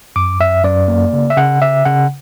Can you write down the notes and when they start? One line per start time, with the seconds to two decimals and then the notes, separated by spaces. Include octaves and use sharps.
0.16 F#2 D6
0.40 F#2 E5
0.64 F#2 D5
0.88 A#3
1.13 C#3
1.30 E5
1.37 C#3 F#5
1.62 C#3 E5
1.85 C#3 F#5